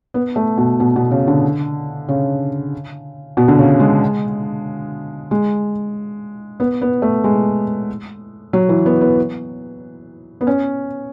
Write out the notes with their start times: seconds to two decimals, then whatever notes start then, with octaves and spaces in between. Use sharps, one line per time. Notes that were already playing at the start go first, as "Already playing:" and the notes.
0.14 B3
0.36 A3
0.57 B2
0.80 B2
0.96 B2
1.11 C#3
1.27 D3
2.08 C#3
3.37 B2
3.48 D3
3.58 C#3
3.80 G#3
5.31 G#3
6.60 B3
6.82 B3
7.02 A3
7.24 G#3
8.53 F#3
8.69 E3
8.86 B3
9.01 B3
10.41 B3
10.47 C#4